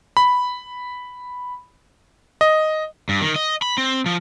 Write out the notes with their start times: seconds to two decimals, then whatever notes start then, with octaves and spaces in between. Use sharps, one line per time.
0.17 B5
2.41 D#5
3.09 G2
3.21 D#3
3.36 D#5
3.62 B5
3.78 C4
4.06 F3